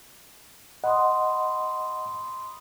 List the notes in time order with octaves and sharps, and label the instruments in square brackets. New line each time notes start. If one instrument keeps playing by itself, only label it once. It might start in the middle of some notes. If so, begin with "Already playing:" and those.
[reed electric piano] D#5 F#5 [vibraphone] B5 C6 D#6